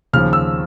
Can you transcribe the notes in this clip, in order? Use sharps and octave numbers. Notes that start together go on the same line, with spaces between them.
D#2 C#3 F3 F6
E6